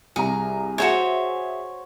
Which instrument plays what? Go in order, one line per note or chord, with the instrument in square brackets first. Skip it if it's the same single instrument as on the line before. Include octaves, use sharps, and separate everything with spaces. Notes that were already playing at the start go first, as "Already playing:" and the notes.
[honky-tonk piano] C2 A#5 [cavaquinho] G#4
[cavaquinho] F#4 C5 C#5 [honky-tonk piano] G#4 E5